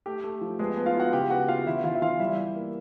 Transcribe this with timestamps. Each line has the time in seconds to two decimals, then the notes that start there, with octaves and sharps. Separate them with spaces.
0.06 A3 G4
0.24 A3
0.41 F3
0.59 G#3 B3 G#4
0.77 B3
0.86 F4 F5
0.95 E4 F#4 F#5
1.13 C#3 G4 G5
1.30 B3 F#4 F#5
1.48 B3 F4 F5
1.66 E3 E4 E5
1.84 E3 F4 F5
1.95 E5
2.02 E3 F4 F5
2.19 G3 E4 E5
2.38 G3
2.55 A#3